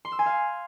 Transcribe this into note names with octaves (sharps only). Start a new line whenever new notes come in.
C6
E6
G#5
F5